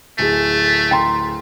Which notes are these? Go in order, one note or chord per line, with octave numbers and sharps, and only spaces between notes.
D1 A3 G#4
G5 A#5 C6